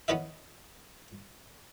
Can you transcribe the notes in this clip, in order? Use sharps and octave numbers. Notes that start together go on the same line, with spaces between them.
B3 C#4 E4 B4 D#5 E5